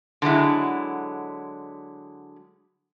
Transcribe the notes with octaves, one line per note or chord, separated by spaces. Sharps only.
D3 F#3 G#3 E4